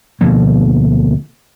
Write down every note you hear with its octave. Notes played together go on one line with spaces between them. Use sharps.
D2 B2 F3 A#3